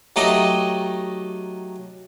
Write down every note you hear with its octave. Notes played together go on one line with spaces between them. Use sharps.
F#3 A3 D#4 G4 D#5